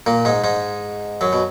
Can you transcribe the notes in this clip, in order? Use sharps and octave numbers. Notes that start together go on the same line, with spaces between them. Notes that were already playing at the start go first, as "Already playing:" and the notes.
A#2 A#3
G#2 G#3
G#2 G#3
F#2 F#3
B2